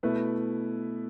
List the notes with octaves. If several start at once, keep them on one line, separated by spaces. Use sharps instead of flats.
B2 A3 E4 B4